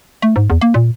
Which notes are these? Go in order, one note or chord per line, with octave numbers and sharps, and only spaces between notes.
A3
G#2
E2
A#3
A#2